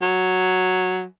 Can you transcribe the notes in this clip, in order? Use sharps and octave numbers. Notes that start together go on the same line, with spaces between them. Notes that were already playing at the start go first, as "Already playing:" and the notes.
F#3